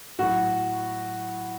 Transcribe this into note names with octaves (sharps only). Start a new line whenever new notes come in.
A2 F#3 F#4